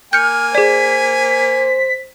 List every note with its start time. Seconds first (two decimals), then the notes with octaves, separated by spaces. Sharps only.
0.13 A#3 G#5 F6 G6 C#7
0.55 G#4 C5 D5 B6